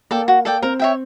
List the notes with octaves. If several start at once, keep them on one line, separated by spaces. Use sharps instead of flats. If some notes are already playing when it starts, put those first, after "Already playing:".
A#3 A4 D5 G5
F#4
A4 D5 G5
C4 A#4
C#5 E5 G5